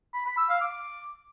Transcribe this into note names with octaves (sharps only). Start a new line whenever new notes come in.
B5
B5
E6
F5
D6